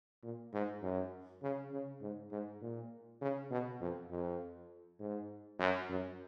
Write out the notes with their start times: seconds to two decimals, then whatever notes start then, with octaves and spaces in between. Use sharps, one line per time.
0.23 A#2
0.53 G#2
0.82 F#2
1.43 C#3
1.72 C#3
2.02 G#2
2.32 G#2
2.61 A#2
3.21 C#3
3.51 B2
3.81 F2
4.11 F2
4.99 G#2
5.59 F#2
5.89 F#2